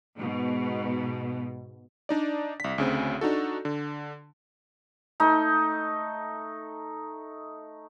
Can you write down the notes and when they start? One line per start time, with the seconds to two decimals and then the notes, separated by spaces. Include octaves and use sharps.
0.18 G#2 B2
2.09 D4 D#4 D5
2.60 C2 B6
2.78 D2 C#3 C4
3.21 D4 D#4 F#4 A4
3.65 D3
5.20 A3 D#4